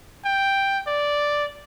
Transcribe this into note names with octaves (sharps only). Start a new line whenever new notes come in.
G5
D5